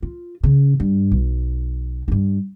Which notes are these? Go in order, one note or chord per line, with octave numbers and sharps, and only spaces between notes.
F4
C#3
G2
B1
G2 D#4